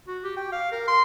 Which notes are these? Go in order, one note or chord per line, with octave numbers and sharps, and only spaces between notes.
F#4
G4
G5
F5
A#4
C6